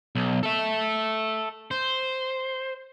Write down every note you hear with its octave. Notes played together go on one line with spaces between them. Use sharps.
B1
A4 E5
C5